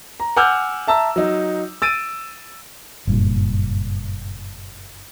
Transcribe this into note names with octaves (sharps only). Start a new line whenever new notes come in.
A#5
F#5 G#5 D6 E6 F6 G6
E5 A5 A#5 E6
F#3 D#4
E6 A6 D7 D#7
F#1 G2 A#2